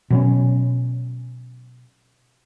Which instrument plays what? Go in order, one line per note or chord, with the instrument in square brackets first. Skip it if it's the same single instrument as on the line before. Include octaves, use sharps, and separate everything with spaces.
[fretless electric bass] B2 F#3 C#4